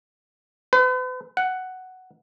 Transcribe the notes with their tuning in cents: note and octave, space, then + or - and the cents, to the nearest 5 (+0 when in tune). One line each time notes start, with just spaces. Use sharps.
B4 +40
F#5 +5